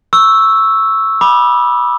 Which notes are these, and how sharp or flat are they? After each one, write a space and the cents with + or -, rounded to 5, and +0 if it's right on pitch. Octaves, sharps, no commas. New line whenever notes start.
C#6 +0 E6 +0
B5 -20 D6 +30